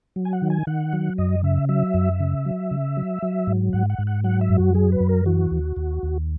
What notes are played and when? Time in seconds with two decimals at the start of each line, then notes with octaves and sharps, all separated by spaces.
0.16 F#3
0.25 G#5
0.33 F#5
0.42 D#3
0.50 G#5
0.67 D#3 F#5
0.93 F#3
1.18 F#2 D#5
1.43 C#3 E5
1.69 F#3 E5
1.94 F#2
2.20 C#3
2.45 F#3
2.71 C#3
2.97 F#3
3.22 F#3
3.47 G#2
3.73 G#2 F#5
3.90 F#5
3.99 G#2
4.07 F#5
4.24 F#3 F#5
4.41 E5
4.49 F#2
4.58 F#4
4.74 F#3 G#4
4.92 B4
5.00 F#2
5.09 A#4
5.26 E3 F#4
5.51 D#2
5.76 D#2
6.03 D#2